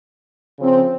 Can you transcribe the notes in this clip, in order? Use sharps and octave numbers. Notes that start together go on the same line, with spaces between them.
C#3 F3 C4